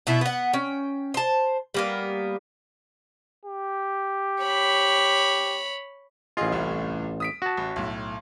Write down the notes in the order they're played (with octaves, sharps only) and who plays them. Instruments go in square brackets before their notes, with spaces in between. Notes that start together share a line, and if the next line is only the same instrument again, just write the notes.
[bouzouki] B2 B3 E4
B3 F#5
C#4 G5
C5 A5
G3 A#3 B3
[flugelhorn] G4
[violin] C#5 B5
[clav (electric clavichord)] A1 F4 [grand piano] G#4 D#5
[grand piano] C2 A2 C#4
D#6 B6 D7
[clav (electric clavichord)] F#4 A5
[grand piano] A1
B1 A2